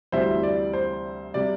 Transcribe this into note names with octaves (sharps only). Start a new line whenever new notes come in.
D2 C3 E3 G3 C5 E5
D5
C5
C3 G3 D5